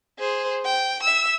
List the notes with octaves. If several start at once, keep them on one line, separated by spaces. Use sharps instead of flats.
G#4 C5
G5
E5 E6